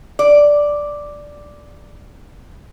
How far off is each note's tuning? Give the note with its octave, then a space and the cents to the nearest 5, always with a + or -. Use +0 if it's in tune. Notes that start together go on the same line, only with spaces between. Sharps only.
D5 +0